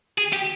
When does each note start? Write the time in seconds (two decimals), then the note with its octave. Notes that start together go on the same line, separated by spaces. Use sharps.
0.18 G#4
0.33 G4